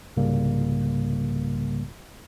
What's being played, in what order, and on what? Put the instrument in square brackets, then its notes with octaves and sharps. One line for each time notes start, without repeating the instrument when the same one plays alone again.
[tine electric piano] C2 G#2 C#3 G3 A#3